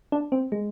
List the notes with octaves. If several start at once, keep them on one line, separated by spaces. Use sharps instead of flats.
D4
C4
G#3